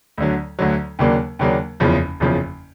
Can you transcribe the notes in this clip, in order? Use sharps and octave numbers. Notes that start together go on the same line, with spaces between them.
D2 D3 F#3
D2 D3 F#3
D#2 C#3 F#3 A#3 D4
D#2 C#3 F#3 A#3 D4
F#1 E2 C#3 F3
F#1 E2 C#3 F3